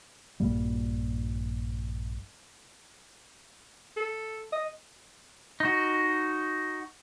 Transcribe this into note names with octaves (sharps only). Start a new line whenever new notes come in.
A#1 G2 G3 A#3
A4
D#5
D#4 F#4